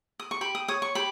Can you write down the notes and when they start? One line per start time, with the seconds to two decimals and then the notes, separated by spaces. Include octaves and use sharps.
0.19 D#6
0.31 C#6
0.41 G4 B5
0.55 D#6
0.68 C#5 D#6
0.82 C#6
0.95 G4 B5